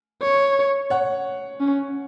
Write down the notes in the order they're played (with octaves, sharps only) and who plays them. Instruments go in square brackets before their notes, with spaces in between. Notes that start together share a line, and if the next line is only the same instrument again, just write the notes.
[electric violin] C#5
[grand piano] C#5 F#5
[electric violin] C#4